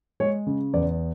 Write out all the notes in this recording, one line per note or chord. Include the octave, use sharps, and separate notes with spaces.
G#3 C#5
C#3
E2 D5